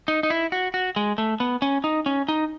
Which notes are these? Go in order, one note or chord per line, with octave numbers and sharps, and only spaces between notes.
D#4
D#4
E4
F#4
F#4
G#3
A3
B3
C#4
D#4
C#4
D#4